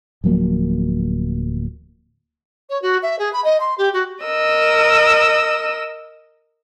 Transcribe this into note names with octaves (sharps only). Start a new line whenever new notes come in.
D1 F3 F#3 A#3
C#5
F#4
E5
G#4
B5
D#5
C6
G4
F#4
A#4 D#5 E6